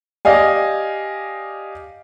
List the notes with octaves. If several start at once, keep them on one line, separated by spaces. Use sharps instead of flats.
G4 D5 D#5 F5 G#5